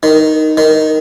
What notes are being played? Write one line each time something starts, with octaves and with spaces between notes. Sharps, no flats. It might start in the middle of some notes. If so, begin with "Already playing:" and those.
D#3
D#3